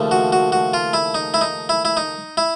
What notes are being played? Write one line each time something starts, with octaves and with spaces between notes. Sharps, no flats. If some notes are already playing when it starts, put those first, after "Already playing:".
Already playing: D#2 C#3 F3 A3
F#4
F#4
F#4
F4
E4
D#4
E4
D#4
E4
E4
D#4
E4